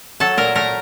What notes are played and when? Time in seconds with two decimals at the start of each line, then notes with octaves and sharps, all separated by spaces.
0.20 F#3 A4 A5
0.37 A#2 A#4 A#5
0.55 A3 A#4 A#5